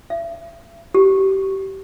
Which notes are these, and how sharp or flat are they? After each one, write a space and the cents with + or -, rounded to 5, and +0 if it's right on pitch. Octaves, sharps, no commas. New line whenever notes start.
E5 +35
G4 -25